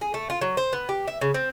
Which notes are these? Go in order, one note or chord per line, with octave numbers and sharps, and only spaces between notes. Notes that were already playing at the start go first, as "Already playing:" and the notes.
G#4
A3
F4
F#3
C5
B3
G4
E5
C#3
C4